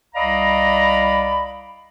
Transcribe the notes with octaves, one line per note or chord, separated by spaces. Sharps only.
C2 D5 D#5 F5 A#5 B5